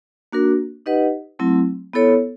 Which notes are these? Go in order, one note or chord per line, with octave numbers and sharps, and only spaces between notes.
A#3 D4 F#4 A#4
D#4 G4 B4 D#5 F#5
F#3 A3 C4 E4
B3 E4 A4 C#5